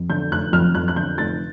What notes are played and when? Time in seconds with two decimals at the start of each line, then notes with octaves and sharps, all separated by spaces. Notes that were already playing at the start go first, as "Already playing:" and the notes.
Already playing: F2
0.10 D3 G6
0.31 F1 F#6
0.53 F2 F6
0.75 F2 F#6
0.88 F#6
0.96 D3 G6
1.18 F1 A6